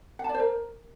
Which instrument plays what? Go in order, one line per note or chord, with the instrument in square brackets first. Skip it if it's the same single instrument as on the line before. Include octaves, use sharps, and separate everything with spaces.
[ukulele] F#5
A5
D5
C5
A#4